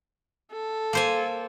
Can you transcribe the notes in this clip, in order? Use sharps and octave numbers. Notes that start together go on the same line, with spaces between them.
A4
A#3 C5 G#5